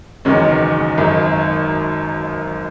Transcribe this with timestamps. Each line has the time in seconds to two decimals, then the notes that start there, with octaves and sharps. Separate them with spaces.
0.25 F#1 E2 D#3 G#3 C#4
0.98 G#1 F#2 D#3